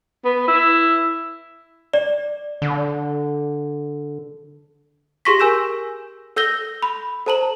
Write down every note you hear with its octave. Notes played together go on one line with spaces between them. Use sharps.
B3
E4
D5
D3
G4 G#4 C6 C#6 A#6 B6
A#4 G#5 E6 G6 E7
A4 E6 G6 A#6 G7
B5
A4 C5 A5 A#5 F#7